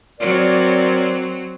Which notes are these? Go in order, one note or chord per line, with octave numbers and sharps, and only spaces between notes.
F#3 C4 A#4 C#5 D5